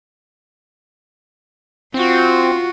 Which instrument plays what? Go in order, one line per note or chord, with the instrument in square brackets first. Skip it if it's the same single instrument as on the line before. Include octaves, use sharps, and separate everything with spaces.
[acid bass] C4 [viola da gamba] F4 F#4